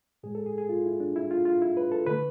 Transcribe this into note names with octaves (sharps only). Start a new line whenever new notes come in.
A2 G#3 G#4
A4
G#4
G#4
F4
E4
D4
E4
F4
F4
E4
B4
A4
D3 A3 B4